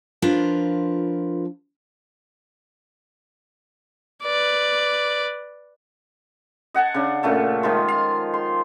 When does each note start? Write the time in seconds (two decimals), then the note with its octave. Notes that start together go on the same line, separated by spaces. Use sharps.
0.22 F3 D4 F4 A#4 B4
4.24 B4 D5
6.74 D#5 F#5 G#5 A5
6.94 C#3 D4
7.23 A#2 C#3 A3 A5
7.63 D#3 F3 G#3 F4
7.88 F5
8.33 C6